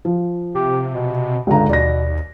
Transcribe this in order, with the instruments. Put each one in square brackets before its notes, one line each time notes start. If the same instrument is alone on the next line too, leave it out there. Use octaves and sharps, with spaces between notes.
[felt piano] F3
[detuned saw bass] C3 [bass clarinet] G4
[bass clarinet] B2
[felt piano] C#2 D3 A#5 [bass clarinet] G2
[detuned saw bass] D#2 [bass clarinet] B2 [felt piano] D5 A#6